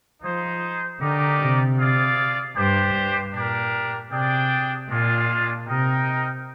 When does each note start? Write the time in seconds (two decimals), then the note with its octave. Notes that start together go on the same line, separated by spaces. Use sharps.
0.22 F3 D#4 G#4 C5
0.99 D3 D#4 G4 A#4 D5
1.39 C3
1.78 F4 G#4 D5 F5
2.56 G2 D4 G4 C5
2.94 G2
3.34 A#2 D4 G4 A#4
4.11 C3 D4 G#4 D5 G5
4.89 A#2 G#3 D4 F4
5.67 C3 D#4 A#4 D#5 G5